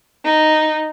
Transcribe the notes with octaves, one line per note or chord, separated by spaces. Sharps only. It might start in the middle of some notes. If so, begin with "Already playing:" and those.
D#4